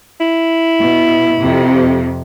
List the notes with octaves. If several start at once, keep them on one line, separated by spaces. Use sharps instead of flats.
E4
B2
F2 C3